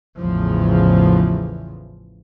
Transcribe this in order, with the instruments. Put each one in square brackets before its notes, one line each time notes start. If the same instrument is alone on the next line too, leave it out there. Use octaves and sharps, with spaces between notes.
[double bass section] A1 E2 C#3 E3 F3